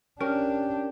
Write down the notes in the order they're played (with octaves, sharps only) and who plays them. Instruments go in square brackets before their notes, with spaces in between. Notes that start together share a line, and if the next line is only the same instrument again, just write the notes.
[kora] C#4 [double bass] D4 [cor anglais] G4 [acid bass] A#4